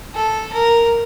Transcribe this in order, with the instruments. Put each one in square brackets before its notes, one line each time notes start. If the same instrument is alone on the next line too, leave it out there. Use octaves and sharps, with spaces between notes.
[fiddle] A4
A#4